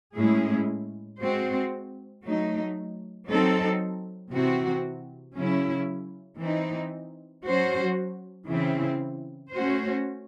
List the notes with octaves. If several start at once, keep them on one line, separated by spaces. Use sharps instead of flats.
A2 G#3 C#4 E4 G#4
G#3 C4 F#4 C5
F#3 A3 D#4
F#3 C4 D#4 A4
C3 E3 C4 F#4
C#3 F#3 C#4 E4
E3 C4 D#4
F#3 C#4 F#4 C5
C#3 E3 C4 E4
A3 C#4 F#4 C5